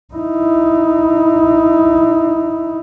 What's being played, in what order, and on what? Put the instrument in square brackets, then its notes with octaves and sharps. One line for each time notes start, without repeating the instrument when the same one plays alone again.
[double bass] D#4 E4